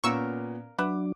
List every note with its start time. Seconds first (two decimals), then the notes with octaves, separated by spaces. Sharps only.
0.04 A#2 A#3 B3 C#4 A#4 C#6 E6
0.78 F#3 D4 B4 E5 F#5 D6